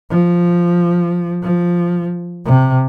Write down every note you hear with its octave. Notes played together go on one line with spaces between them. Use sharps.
F3
F3
C3